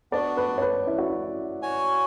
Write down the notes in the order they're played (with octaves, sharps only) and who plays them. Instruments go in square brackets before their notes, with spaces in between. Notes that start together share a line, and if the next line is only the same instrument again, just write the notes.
[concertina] B3 D4 F#4 [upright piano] D5
[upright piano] B4
C#5
B4
E4
F#4
E4
[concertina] F#4 C#5 G#5